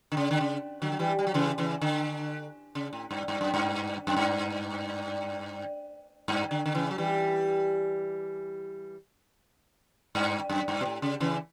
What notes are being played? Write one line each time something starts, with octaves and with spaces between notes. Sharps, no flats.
D3
C#3
D3
C#3
D3 F#3
F#3
E3 G3
G3
F#3
C#3 E3
C#3 E3
D3
C#3
A2
G2
G2
F#2
G2
F#2
G2
G2
D3
D3
C#3 E3
F#3
E3 G3
G2
F#2
G2
B2
A2
C#3
C#3 E3